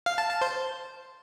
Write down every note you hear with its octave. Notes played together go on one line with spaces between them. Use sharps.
F5
A5
A5
C5